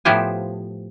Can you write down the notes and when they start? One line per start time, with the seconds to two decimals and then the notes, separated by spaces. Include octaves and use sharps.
0.05 A2 F3 B3 G4 C5 G#5